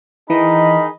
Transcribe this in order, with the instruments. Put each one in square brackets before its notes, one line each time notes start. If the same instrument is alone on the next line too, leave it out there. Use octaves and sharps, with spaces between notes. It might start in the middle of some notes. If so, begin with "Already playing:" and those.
[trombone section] D#3 D#4 G#4 [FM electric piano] E3 [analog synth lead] D#5 [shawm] B5